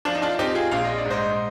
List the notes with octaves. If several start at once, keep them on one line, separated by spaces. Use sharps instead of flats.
F3 D4 F4
D#4
D4 F4
C4 D#4 G4
F4 G#4
A#1 F5
D#5
D5
G#2
C5 D#5